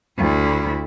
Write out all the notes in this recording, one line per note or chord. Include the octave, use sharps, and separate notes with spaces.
D2 E4